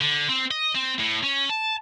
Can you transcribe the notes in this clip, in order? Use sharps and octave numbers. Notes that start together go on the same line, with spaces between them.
D3
C4
D#5
C4
A2
C#4
A5